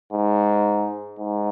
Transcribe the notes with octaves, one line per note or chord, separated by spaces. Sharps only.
G#2
G#2